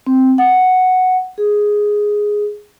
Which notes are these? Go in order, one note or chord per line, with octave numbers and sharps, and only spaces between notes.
C4
F#5
G#4